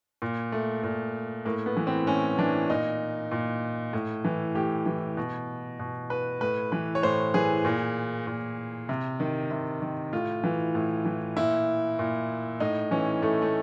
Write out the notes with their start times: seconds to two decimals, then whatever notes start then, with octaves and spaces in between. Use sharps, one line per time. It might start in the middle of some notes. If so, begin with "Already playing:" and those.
0.22 A#2
0.52 A3
0.84 A#2
1.46 A2 A#3
1.66 B3
1.77 E3
1.87 C4
2.07 A2 C#4
2.38 E3 D4
2.70 A#2 D#4
3.31 A#2
3.93 A2
4.24 E3
4.55 A2 G4
4.86 E3
5.17 B2
5.79 B2
6.10 B4
6.41 A2 B4
6.72 E3 B4
6.95 C#5
7.03 A2 C5
7.34 E3 G#4
7.65 A#2
8.27 A#2
8.89 C3
9.20 D#3
9.51 C3
9.82 D#3
10.13 A2 F4
10.44 E3
10.75 A2
11.05 E3
11.37 A#2 E4
11.99 A#2
12.60 A2 D#4
12.91 E3 C#4
13.22 A2 A3
13.42 A3